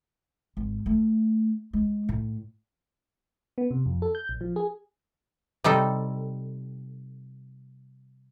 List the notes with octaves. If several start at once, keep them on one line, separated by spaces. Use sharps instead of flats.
G#1
A3
G#3
A2
B3
C3
F2
A4
G6
A#1
F3
G#4
C3 G3 D#4 A4